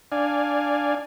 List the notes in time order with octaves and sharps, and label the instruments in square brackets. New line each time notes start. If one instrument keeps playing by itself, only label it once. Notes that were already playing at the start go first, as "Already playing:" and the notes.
[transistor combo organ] D4 D5 F5 G#5